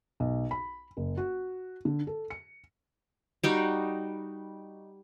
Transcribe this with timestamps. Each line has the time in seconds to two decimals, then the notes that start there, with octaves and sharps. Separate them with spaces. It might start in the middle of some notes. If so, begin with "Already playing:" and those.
0.20 B1
0.51 B5
0.97 F#1
1.17 F#4
1.85 D3
2.07 A4
2.30 C#7
3.43 G3 D#4 F#4